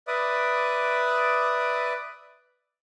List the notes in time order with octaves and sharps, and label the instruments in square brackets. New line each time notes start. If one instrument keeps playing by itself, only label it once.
[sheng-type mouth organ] B4 D5 E5 D6 D#6